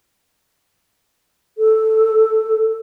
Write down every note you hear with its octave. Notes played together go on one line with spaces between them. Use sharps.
A4